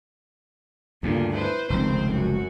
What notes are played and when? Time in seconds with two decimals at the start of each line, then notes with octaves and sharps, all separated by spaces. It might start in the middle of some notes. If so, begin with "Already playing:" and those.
1.03 D2 G2 C#3 A#3 F4
1.34 E4 B4 C5
1.70 F1 C#2 D#3 C4 C5
2.11 F#2 F#4